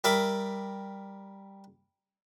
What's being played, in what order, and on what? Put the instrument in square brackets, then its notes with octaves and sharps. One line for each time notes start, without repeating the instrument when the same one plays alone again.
[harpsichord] G3 A#4 E5 B5 D6